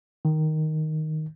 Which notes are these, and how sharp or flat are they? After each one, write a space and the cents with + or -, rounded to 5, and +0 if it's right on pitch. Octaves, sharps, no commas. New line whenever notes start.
D#3 +0